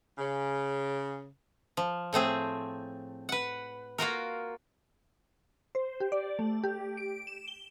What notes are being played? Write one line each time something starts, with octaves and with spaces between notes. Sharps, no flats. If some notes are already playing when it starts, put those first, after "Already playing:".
C#3
F3
A2 A3 C4 G#4
B4 F#5
A#3 F4 F#4 A#4
C5
G4
D5
A3
G4
D7
E7
G7